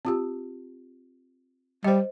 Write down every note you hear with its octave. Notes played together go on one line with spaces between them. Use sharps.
C4 F4 G4
G3 C5 D#5